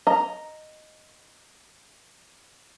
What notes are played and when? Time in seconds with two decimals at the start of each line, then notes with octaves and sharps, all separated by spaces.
0.07 D#5 A#5